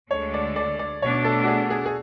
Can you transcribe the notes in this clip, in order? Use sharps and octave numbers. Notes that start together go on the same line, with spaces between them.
D2 D3 G#3 D4 A4 C#5
D5
D5
D5
B2 A3 D4 C#5
A4
F#4
G#4
G#4
G#4